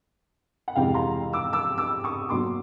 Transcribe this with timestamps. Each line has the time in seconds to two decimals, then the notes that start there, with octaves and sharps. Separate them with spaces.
0.68 F#5
0.75 F2 C3 E3 G#3 F5 G5
0.94 A#5 C6
1.33 D6 E6
1.53 D6 E6
1.78 D6 E6
2.04 C#6 D#6
2.29 B2 F#3 A#3 C6 D6